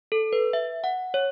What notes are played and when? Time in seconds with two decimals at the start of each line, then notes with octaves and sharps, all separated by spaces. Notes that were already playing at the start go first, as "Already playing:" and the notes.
0.12 A4
0.33 B4
0.53 E5
0.84 F#5
1.14 C#5